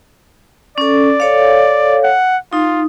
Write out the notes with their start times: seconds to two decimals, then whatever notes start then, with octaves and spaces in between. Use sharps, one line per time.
0.78 C#4 A4 D5
1.20 A4 C#5 F5
2.04 F#5
2.53 D#4 F4